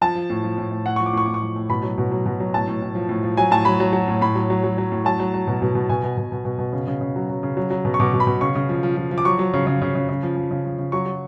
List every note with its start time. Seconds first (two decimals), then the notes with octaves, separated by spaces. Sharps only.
0.02 F3 A5
0.15 F3
0.30 A2
0.43 F3
0.58 A2
0.71 A2
0.86 A2 F#5
0.96 F3 C#6
1.06 D6
1.13 A2 C#6
1.26 A2 D6
1.34 C#6
1.42 F3
1.56 A2
1.70 B2 B5
1.83 F#3
1.98 B2
2.11 F#3
2.26 B2
2.40 F#3
2.54 A2 A5
2.67 A2
2.82 A2
2.95 F3
3.09 A2
3.23 F3
3.37 F#3 G#5
3.51 A2 A5
3.65 F#3 B5
3.80 F#3
3.93 F#3
4.08 A2
4.21 A2 B5
4.35 F#3
4.50 F#3
4.64 F#3
4.78 F#3
4.92 A2
5.05 F#3 A5
5.20 F#3
5.34 F#3
5.47 B2
5.62 B2
5.75 B2
5.89 B2 G#5
6.03 B2
6.17 B2
6.32 B2
6.45 B2
6.59 B2
6.73 C#3
6.87 C#3
7.01 C#3
7.16 F#3
7.30 F#3
7.43 C#3
7.57 F#3
7.71 F#3
7.85 B2
7.94 C#6
8.00 B2 D6
8.14 B2
8.20 B5
8.27 B2
8.41 C#3 C#6
8.55 C#3
8.69 F3
8.83 F3
8.97 F3
9.11 F3
9.18 D6
9.25 F#3 C#6
9.39 F#3
9.53 C#3
9.67 C#3
9.82 C#3
9.95 C#3
10.09 C#3
10.23 F3
10.36 F3
10.51 C#3
10.65 F3
10.78 C#3
10.92 F#3 C#6
11.06 F#3